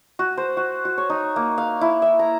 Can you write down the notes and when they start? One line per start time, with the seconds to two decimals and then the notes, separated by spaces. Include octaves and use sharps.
0.19 F#4
0.38 C5
0.57 F#4
0.85 F#4
0.98 C#5
1.10 D#4
1.36 A#3
1.58 F5
1.81 E4
2.02 E5
2.19 A#5